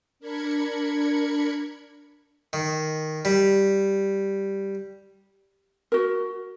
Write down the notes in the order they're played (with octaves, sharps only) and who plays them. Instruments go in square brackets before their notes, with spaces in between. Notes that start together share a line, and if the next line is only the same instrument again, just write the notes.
[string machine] D4 A#4 B5 G#6 C#7
[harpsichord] D#3
G3
[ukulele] F#4 A#4